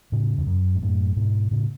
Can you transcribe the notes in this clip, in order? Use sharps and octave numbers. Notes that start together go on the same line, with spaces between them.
A2 C#3
E2
F#2
G#2
F#2 A2
G#2 B2
A2 C#3